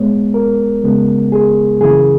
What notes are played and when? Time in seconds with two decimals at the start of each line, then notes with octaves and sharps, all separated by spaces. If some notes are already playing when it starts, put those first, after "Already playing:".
Already playing: A#2 G#3 B3 C#5
0.34 A#4
0.84 C#3 G#3 B3
1.32 G#4
1.80 F#2 C#3 E3 A#3 G#4